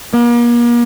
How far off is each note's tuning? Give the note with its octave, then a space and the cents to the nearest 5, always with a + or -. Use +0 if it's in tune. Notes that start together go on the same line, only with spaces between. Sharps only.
A#3 +40